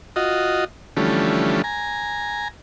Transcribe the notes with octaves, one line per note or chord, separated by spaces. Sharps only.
F4 F#4 D#5
D3 E3 F3 G3 A3 C#4
G#5 A#5